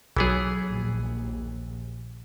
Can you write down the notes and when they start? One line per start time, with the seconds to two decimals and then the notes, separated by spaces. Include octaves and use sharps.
0.17 B1 E3 F#3 B3 G#4
0.68 A#1 D#2